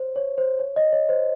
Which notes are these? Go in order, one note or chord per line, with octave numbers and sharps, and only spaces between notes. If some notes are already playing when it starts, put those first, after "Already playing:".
Already playing: C5 C#5
C#5
C5
C#5
D#5
C#5
C5